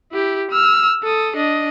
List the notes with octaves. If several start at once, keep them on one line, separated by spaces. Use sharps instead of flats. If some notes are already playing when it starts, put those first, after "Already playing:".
E4 G4
E6 F6
A4 D#6
D4 D#5